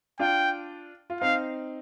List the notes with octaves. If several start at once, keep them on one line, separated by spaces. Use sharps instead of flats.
D4 F4 G5
F4
C4 D#4 F5